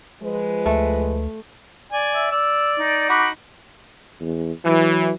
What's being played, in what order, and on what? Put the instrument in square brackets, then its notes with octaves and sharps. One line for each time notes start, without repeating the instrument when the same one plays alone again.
[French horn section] F3 G#3 B4
[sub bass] D2 [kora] A3
[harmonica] D5 G#5
[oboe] E5
[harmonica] D5 [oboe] E6
[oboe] D#4
[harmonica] F#4 B5 D6
[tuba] E2
[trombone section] E3 [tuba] F#3